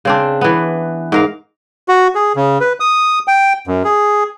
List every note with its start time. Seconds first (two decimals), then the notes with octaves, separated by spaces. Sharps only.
0.05 C#3 C4 D4
0.41 E3 B3
1.12 G#2 A#4 F5
1.88 F#4
2.15 G#4
2.36 C#3
2.61 B4
2.80 D#6
3.28 G5
3.67 F#2
3.84 G#4